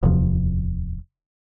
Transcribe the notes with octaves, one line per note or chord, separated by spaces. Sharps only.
D1 E2 C3 F3